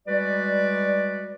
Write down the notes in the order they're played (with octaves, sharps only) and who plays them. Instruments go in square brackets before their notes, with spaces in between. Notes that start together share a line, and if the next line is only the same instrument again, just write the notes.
[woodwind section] G3 G#3 F#4 B4 D5